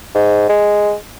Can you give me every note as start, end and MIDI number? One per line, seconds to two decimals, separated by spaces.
0.15 0.49 44
0.49 0.94 56